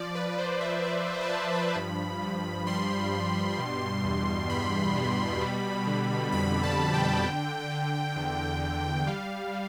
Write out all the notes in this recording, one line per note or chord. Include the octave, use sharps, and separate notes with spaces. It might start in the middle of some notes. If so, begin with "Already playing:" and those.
Already playing: F3 D5
B4
B4
F3 C5
E5
F3 D5
B4
C5
B4
F3 A5
B5
G2
G2
G3 C6
G2
B2
E2
E2 B5
B2
G3
D3
F2 B5
A5
D3
G5
D3
D3
E2
E2
G3 F5
G3